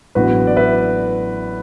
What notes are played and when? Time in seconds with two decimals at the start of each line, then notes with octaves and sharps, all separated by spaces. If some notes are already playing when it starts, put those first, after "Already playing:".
0.15 A1 A2 F#3 B3 D4 F#4 B4
0.47 D5
0.56 B4 E5